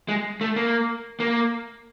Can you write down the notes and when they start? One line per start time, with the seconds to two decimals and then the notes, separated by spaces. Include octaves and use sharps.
0.08 G#3
0.41 A3
0.56 A#3
1.20 A#3